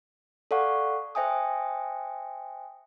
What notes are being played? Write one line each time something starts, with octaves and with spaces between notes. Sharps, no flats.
A4 D5 F5 F#5 C#6
C5 E5 G5 G#5 D#6